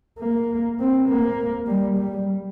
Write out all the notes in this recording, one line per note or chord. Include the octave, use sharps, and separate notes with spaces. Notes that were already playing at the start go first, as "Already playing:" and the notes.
A#3
C4
A#3
G3
G3